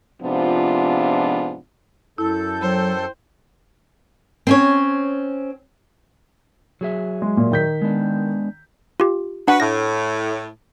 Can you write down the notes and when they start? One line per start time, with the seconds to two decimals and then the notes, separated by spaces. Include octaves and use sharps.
0.22 G#2 C3 F3 B3 D4 F4
2.18 F#2 E4 A4 G6
2.62 F#3 C5 G5
4.47 C4 C#4 C#5
6.81 F#3 G#4 E5
7.22 G#3
7.37 A#2
7.52 D#3 G6 B6
7.82 G#3 B3 D4
9.00 F4 G4
9.48 D4 F#4 B4 F#5
9.60 A2 A#6